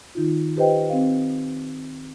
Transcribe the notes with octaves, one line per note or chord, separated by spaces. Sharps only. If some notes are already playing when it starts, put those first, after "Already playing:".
D#3 D#4 F4
G4 B4 C5 D#5 G5
C4 F5